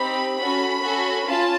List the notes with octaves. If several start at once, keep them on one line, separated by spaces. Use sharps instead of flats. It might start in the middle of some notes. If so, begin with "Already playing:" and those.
Already playing: C4 D#4 G4 B5
C#4 F#4 A4 B5
C#4 F#4 A4
C#4 F4 A5